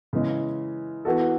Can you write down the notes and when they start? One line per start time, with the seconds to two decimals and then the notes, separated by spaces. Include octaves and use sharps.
0.13 C#3 E3 G#3
1.05 E3 B3 F#4 A4